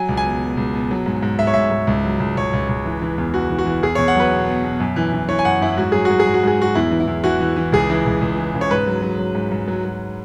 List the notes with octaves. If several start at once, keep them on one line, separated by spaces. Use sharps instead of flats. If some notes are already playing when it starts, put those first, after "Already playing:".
Already playing: F#3 G#5
C#2
G#5
B2
B2
C#2
B2
F#3
G#2
G#2
G#2 E5
C#5
G#2 E5
G#2
C#2
F#3
C#2
C#2 C#5
C#2
C#2
E3
E3
E2
E3 F#4
E3
F#4
E3
E2 G#4
E2 C#5
F#5
F#3 B4
B2
B2
B2
F#2
E3
E3
E3 C#5
G#5
F#2 F#5
F#2 E4
G#2 F#4
F#3 G#4
F#4
F#3
G#4
G#2
F#4
G#2 G#4
F#3 F#4
E2 E4
E3
E4
E2
E3 F#4
E3
E3
C#2 G#4
E3
C#2
C#2
E3
C#3
C#5
G#2 B4
F#3
F#3
F#3
G#2
G#2
F#3
F#3